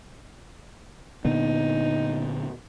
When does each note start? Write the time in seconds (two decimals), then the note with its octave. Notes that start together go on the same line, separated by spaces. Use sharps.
1.25 A#2 D3 B3 D#4